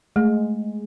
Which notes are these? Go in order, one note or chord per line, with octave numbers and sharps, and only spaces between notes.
G#3 A3